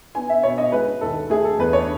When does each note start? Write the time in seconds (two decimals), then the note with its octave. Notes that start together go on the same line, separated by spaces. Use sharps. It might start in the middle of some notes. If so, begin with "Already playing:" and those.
0.15 B3 G#5
0.29 E5
0.43 B2 C#5
0.58 D#5
0.72 G#3 B4
1.01 D#2 A4
1.30 A3 G#4
1.44 A4
1.59 E2 B4
1.73 C#5